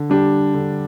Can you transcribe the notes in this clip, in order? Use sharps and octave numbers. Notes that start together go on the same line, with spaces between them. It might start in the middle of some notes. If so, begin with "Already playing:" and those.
Already playing: D3
G3 D4 G4
D3